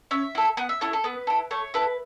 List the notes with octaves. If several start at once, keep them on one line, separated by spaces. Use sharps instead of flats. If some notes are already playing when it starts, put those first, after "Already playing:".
C#4 E5
E4 A4
B3 F#5
E5
E4 A4 C#5
A4
B3 B4
E4 A4
A3 C#5
E4 A4 B4